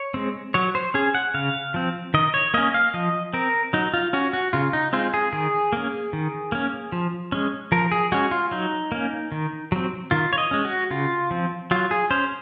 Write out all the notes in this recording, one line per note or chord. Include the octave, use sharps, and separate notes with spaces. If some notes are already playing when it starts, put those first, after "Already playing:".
Already playing: C#5
G#3 C4
F#3 C#5
C5
C#4 G#4
F#5
C#3 F5
F3 C4
D#3 D#5
C#5
A#3 C#4 D#5
F5
F3 D#5
C4 A#4
F#3 D#4
F4
C#4 F#4
F#4
C#3 F4
D#4
G#3 C4 F4
G#4
D#3 G#4
A#3 C#4
D#3
A#3 C#4
F3
G#3 C#4
F3 A#4
G#4
G#3 C#4 F#4
F4
F#3 D#4
A#3 C#4
D#3
F#3 C4
D#3 F4
C#5
D#5
G#3 C#4
F#4
C#3 F4
F3 C4
F#3 F4
G#4
C#4 C5